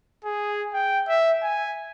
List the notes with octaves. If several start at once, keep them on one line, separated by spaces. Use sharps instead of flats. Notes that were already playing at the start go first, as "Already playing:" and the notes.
G#4
G5
E5
G#5